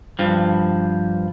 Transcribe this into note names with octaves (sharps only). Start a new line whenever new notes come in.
G2 F3